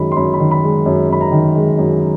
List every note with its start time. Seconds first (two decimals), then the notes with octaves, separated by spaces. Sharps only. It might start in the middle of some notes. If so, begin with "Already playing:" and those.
Already playing: F#2 D#3 G#3 B5
0.12 C6
0.16 F#2 B5
0.34 B5
0.40 D#3
0.51 B5
0.63 G#3
0.86 F#2
1.10 F#2 B5
1.21 A#5
1.32 D#3
1.56 G#3
1.78 F#2